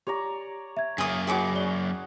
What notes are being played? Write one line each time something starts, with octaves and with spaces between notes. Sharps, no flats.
G4 C#5 D5 A#5
E5 G#6
F#2 A#3 G#4 D#6
E4 F#4 G#4 C#5 D6
D5 G7